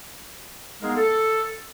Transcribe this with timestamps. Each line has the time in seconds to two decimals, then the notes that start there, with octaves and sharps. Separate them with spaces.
0.82 G#3 B3 D#4 G#4 A#4 F5
0.97 A4